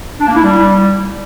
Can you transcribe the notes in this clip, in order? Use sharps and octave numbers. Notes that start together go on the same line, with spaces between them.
D4
A#3
E4
G3